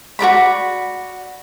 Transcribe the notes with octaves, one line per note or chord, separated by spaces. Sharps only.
F#4 A#4 D5 B5